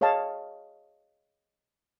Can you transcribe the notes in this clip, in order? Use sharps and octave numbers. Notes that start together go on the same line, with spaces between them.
G#4 C#5 D#5 F5 A5